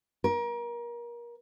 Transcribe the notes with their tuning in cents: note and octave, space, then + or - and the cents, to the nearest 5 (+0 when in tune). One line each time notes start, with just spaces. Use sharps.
A#4 +30